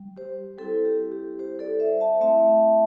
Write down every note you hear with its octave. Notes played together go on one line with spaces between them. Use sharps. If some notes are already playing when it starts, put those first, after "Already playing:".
Already playing: G3
G4 C5
G3 C4 E4 A4
G4
G4
G4 C5
A4 D5
C5 E5
E5 A5
A3 C4 E4 E5 A5